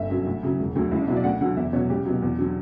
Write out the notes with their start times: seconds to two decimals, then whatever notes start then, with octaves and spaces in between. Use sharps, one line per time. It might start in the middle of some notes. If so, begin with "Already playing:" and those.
Already playing: G1 E5
0.10 F#2 D3 F#3
0.26 D2
0.43 C#3 F#3
0.59 E1
0.75 D2 D3 F#3
0.91 C#2 E4
1.00 D4
1.08 B2 F#3 E4
1.16 D5
1.24 D2 F#5
1.41 D3 F#3 F#5
1.57 E2 E5
1.73 B2 F#3 C#5
1.89 C#2 G4
2.05 B2 F#3
2.22 E2
2.38 D3 F#3